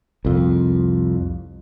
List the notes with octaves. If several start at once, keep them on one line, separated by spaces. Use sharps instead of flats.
C2 F2